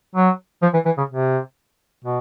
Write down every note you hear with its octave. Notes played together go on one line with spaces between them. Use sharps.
F#3
F3
E3
E3
C#3
C3
B2